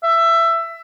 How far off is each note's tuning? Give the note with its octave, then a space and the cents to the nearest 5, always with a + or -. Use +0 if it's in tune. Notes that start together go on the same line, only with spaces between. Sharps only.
E5 +15